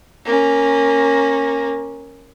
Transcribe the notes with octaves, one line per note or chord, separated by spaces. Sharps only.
A#3 C#4